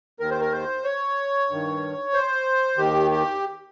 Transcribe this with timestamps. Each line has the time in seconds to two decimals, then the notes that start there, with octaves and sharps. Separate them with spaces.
0.20 D#2 D#3 A#4
0.30 C5
0.41 A#4
0.52 C5
0.84 C#5
1.49 G2 D#3
2.14 C5
2.78 D#2 D#3 G4
3.11 G4